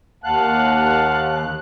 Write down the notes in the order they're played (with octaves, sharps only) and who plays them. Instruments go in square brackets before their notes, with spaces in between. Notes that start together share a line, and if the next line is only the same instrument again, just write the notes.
[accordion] D#2 F#6 [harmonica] F5 F#5 A5